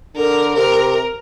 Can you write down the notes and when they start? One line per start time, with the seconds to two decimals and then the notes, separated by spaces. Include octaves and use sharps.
0.15 D3 A#4
0.55 C3 A#4